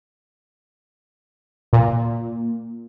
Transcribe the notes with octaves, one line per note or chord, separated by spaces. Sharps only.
A#2